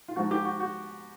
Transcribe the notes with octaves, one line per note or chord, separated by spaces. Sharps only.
F4
G#2 F3 F#4
G4
F#4
F#4